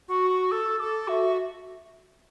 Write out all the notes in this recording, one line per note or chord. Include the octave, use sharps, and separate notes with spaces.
F#4 C#6
C#6
A4 E6
A4 D6
F#4 E5